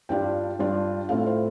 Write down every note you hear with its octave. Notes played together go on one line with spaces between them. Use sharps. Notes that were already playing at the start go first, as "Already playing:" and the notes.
G2 G3 D4 F4 G5
G2 G3 D4 F4
A2 A3 C4 F4 F5
C5